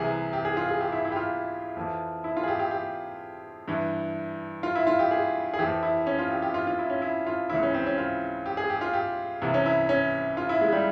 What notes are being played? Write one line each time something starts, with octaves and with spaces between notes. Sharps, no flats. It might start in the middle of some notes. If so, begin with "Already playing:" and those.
Already playing: C2 C3 E3 G#4
G4
G#4
F4
G#4
G4
E4
E4
G4
F4
F2 E3
E4
F4
G#4
G4
G4
G4
G2 E3
F4
E4
F4
G4
G#4
G#4
F2 E3 G4
E4
C#4
F4
G4
G4
F4
F4
E4
C#4
E4
F4
C#2 C#3 E3 E4
C#4
C4
C#4
F4
G4
G#4
G4
F4
G4
C2 C3 E3
C#4
E4
C#4
F4
E4
G#3
G3